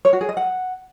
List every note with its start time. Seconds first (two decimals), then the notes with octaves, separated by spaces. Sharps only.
0.05 C#5
0.13 F#4
0.21 G#4
0.29 D#5
0.37 F#5